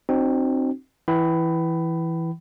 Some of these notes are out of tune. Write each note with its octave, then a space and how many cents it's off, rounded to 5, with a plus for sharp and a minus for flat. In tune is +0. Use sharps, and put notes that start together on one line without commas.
C4 +10 D#4 -40 F#4 +0
E3 +0 G5 -40 B5 +10